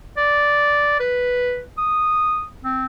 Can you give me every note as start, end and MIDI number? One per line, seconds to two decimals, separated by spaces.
0.17 0.95 74
1.00 1.60 71
1.78 2.45 87
2.64 2.86 60